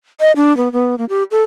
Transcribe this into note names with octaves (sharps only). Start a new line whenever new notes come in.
D#5
D4
B3
B3
A#3
G4
A4